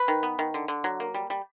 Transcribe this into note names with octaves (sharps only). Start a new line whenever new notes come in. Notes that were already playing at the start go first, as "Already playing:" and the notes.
Already playing: B4
D#3
B3
D#3
D3
D3
F#3
A#3
G3
G3